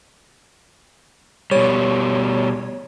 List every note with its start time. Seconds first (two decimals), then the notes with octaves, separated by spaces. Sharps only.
1.51 B2 G3 C#5